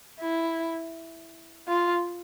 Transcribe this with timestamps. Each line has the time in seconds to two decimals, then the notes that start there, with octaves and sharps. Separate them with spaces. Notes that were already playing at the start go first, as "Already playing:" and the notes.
0.21 E4
1.68 F4